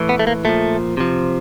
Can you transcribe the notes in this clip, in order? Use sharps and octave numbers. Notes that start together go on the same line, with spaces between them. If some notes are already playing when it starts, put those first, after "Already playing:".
Already playing: A2 E3
B3
A3
A#3
A#2 F3 A3
C3 F3